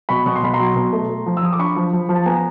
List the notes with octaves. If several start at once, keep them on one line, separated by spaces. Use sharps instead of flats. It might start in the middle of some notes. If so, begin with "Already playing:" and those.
B2 B5 C#6
B2 C#6
C6
B2 B5
A#5 C6
F#3
B2
A3
A3
F3
E6
F3 D#6
D6
D4 B5 C#6
F3
F3
F3
A5
B3 G#5 A#5